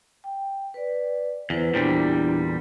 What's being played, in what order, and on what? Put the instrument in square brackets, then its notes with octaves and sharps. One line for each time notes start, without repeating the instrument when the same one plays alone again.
[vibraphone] G5
B4 D5
[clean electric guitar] E2 [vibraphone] E4 B4 C5
[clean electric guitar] E2 A#2 G3 [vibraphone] D4 E4 G4